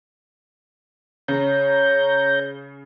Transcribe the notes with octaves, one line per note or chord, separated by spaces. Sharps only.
C#3 C#5 A#5 G6